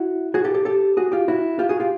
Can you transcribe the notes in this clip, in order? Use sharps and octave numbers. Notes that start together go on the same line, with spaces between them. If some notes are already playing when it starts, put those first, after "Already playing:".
Already playing: E4 F#4
F#4 G#4
G4 A4
G4 A4
G4 A4
F#4 G#4
F4 G4
E4 F#4
F4 G4
F#4 G#4
F4 G4